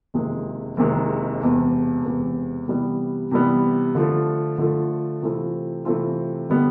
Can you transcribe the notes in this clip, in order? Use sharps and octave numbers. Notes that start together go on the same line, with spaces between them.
F#1 F2 C3 D#3 G#3
F#1 F2 C3 D#3 G#3
E1 E2 C3
E1 E2 C3
C3 E3 G3 B3
C3 E3 G3 B3
D3 F3 A3
D3 F3 A3
C3 E3 A3 C4 F4
C3 E3 A3 C4 F4
D3 G3 B3